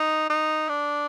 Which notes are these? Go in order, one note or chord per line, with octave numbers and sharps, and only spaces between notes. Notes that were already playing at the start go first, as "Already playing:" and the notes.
Already playing: D#4
D#4
D4